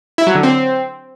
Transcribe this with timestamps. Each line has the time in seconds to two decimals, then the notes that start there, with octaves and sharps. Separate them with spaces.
0.18 E4
0.27 F#3
0.35 D3
0.43 C4